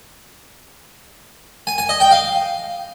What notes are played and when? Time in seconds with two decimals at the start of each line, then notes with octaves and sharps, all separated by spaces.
1.67 G#5
1.78 G#5
1.89 D#5
2.00 G5
2.11 F5